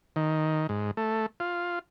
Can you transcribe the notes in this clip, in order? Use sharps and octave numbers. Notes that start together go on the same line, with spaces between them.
D#3
G#2
A3
F4